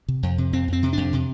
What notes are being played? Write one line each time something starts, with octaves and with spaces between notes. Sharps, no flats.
C3
F2
C3
F2 C4
F2 C4
C3
F2 D4
C3